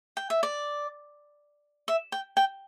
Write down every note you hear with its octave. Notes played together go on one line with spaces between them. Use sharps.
G5
E5
D5
E5
G5
G5